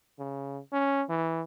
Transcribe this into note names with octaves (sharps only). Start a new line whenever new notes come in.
C#3
C#4
E3